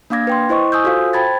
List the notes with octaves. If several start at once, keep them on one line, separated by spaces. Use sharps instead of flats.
A#3 D4 F5 D6 G#6 A#6
B4 G5 C6
E4 C5 D#5 C#6
G#5 D#6 E6 G6
F4 F#4 A4 C5 F5
C5 G5 A5 B5 G#6 A6